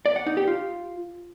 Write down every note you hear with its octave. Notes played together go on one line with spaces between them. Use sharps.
D5
F#5
D#4
G4
F4